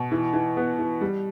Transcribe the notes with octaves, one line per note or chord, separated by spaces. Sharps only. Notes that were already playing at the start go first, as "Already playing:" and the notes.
Already playing: B2
E3
E3
B3
E3
G3